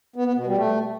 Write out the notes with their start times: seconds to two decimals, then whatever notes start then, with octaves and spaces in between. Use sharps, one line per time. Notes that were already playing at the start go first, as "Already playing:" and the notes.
0.16 B3
0.26 B3
0.36 B2
0.47 G3
0.57 A3